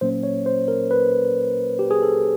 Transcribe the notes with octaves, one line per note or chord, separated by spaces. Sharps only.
A#2 F#3 A#3 C#4 C5
C#5
C5
A#4
B4
G4
G#4
A4